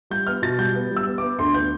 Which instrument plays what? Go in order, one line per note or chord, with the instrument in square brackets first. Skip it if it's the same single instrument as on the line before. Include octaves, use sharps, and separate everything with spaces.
[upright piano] G3 G6
B3 F6
B2 A6
G3 G6
B3
G3
E6
B3
B3 D6
D2 C6
B3 G6